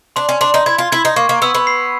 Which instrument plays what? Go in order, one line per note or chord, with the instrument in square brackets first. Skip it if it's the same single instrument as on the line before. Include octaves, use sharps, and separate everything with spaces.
[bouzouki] D4 [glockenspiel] C6
[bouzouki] C#4
[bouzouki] D4 [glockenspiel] C6
[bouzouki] D#4
[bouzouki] E4 [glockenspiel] G#6
[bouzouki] F4
[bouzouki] E4 [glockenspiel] G#6
[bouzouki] D#4
[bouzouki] A#3 [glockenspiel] C#6
[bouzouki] A#3
[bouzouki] B3 [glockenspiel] E6
[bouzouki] B3
[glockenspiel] C7